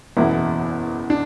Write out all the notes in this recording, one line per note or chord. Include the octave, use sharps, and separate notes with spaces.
F#1 E2 B2 E4
D4